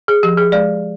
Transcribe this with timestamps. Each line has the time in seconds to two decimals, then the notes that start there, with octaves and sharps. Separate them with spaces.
0.08 G#4
0.23 F3 G4
0.37 G#4
0.52 G#3 D5